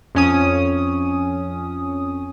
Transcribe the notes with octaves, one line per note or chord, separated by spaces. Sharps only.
F2 C#4 D#6